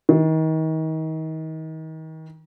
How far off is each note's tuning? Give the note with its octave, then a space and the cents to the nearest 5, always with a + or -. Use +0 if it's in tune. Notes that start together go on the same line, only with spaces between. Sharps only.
D#3 +35